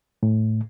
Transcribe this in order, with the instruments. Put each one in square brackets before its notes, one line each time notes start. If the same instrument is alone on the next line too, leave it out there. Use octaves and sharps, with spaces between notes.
[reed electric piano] A2